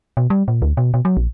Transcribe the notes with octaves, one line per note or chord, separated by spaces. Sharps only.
B2
G3
A#2
D2
B2
B2
F#3
A#1